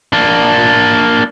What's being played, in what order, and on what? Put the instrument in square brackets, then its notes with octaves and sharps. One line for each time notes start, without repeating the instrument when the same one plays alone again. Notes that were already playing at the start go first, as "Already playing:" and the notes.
[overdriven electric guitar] A#3 D4